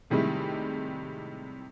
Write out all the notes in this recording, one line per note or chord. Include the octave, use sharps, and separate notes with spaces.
A2 C3 D#3 G3 G#3 E4